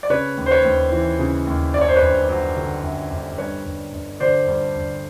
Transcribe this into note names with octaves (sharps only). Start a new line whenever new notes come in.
D5
C#3 B4 C#5
D#2
C5
B4 C#5
D#2
E3
C#3
D#2
F#2 D5
C#5
C5
B4 C#5
G1
F#3
D3
F#2
G1
G2 B4 C#5
G1
G1
D3 C5 D5
G2
G1